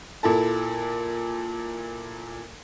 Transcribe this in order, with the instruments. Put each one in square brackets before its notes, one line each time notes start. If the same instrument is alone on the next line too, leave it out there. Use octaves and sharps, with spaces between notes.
[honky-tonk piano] A#2 E4 A4